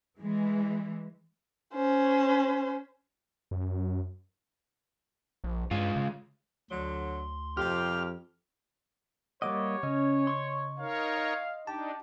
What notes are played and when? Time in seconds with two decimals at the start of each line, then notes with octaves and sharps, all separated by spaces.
0.19 E3 G#3
1.74 C#4 C5
3.51 F#2
5.44 A#1
5.71 G2 G#3 F4
5.96 C#3
6.70 D2 D3 F#3 C6
7.57 F2 C3 F4 G4 F6
9.42 G3 A#3 C#5 D#5 F#5 D6
9.83 C#3 C#4 D#5
10.27 C6 C#6
10.79 D#4 A#4 C#5 F5
11.18 D#5
11.67 D4 D#4 G4 A5